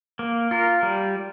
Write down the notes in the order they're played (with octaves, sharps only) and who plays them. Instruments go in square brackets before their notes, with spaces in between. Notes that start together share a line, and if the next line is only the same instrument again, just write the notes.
[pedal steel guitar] A#3
F4 A#4
G3